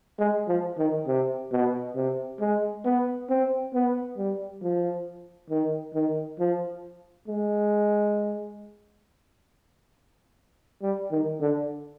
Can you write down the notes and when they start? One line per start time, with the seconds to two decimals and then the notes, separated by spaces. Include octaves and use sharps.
0.19 G#3
0.48 F3
0.78 D#3
1.07 C3
1.52 B2
1.96 C3
2.40 G#3
2.85 B3
3.30 C4
3.74 B3
4.17 G3
4.62 F3
5.50 D#3
5.94 D#3
6.39 F3
7.28 G#3
10.82 G3
11.12 D#3
11.41 D3